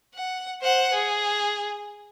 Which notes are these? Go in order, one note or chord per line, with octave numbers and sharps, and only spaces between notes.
F#5
C5 F#5
G#4